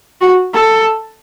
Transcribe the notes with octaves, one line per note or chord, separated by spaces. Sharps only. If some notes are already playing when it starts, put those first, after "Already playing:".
F#4
A4